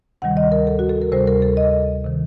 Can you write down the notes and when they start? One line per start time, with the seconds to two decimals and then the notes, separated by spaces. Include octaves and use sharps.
0.22 D2 C3 D#3 G3 F#5
0.37 D#5
0.52 A#4
0.67 A4
0.79 F#4
0.89 A4
1.02 A#4
1.12 D2 C3 G3 C5
1.28 A#4
1.42 A4
1.57 D#5
2.05 C3 D#3